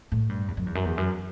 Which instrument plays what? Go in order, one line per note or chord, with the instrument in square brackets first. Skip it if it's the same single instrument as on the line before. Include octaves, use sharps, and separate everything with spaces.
[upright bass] A2
G2
E2
F#2
E2
F#2
E2
F#2